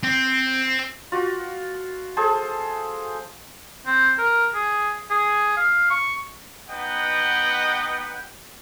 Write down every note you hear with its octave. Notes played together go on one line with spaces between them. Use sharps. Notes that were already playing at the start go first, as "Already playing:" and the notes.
C4
F4 F#4
G#4 A4 C5 A5
C4
A#4
G#4
G#4
F5
C#6
B3 D#4 B4 D#5 F#5 G5